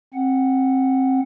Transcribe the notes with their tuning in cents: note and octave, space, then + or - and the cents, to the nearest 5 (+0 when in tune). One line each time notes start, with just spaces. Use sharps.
C4 +20 F#5 +0